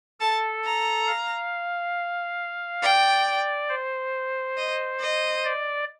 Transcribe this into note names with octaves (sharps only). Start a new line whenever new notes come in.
A4 A5
A#5
F5
D5 G5
C5
D#5
D#5
D5